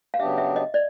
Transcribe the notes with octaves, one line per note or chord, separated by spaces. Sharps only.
F5
C#3 F#3 B3 D4 G4 E5
E5
D#5
D5